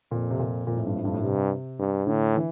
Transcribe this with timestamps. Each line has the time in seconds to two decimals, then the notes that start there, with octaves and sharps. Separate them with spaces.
0.11 F2 A#2
0.31 C3
0.39 A#2
0.67 F2 A#2
0.77 A2
0.87 G2
0.95 A2
1.05 G2
1.14 A2
1.23 G2 C3
1.79 G2
2.07 A2 D3
2.35 E3